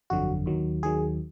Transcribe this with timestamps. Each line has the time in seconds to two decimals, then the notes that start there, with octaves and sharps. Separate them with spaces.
0.10 G1 F2 D3 F#3 F#4
0.46 D#2 D#3 F#3
0.83 D#2 D#3 F#3 G#4